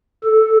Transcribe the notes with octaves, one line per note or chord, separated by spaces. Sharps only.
A4